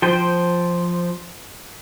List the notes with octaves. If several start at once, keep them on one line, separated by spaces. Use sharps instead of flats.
F3 C5 G5